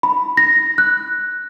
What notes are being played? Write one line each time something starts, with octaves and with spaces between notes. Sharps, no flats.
B5
A#6
F#6